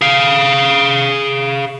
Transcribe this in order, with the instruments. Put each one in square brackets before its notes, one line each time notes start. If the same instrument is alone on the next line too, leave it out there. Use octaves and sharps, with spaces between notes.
[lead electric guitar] G#4 F5